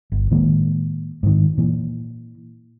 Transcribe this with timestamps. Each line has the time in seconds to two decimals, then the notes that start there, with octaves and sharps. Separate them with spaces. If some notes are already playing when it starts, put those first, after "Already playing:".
0.12 G1
0.31 A2 D#3 G#3 A#3
1.23 G#2 D#3
1.58 A#2 E3